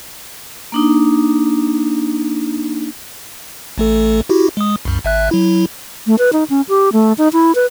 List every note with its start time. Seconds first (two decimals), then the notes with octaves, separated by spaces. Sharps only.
0.72 A#3 D4 D#4
3.78 A1 A3 A4
4.29 E4 F#4 G4
4.57 G#3 D#6
4.85 C2 F#2
5.04 G#1 E5 F#6
5.31 F#3 E4
6.07 A3
6.19 B4
6.33 D#4
6.50 C#4
6.69 G4
6.93 A3
7.18 D#4
7.33 E4
7.55 B4